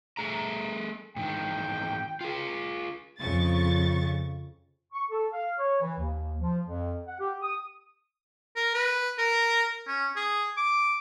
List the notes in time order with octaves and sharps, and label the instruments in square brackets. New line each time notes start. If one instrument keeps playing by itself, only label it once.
[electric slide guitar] A3 G#4 A#5
[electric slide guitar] G#2 D#3 E3 [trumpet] G5
[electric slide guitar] F4 G#4
[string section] F2 C#3 C#6 A6
[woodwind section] C#6
A4
F5
C#5
E3
D#2
F3
F2
F#5
G4
D#6
[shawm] A#4
B4
A#4
C#4
G#4
D6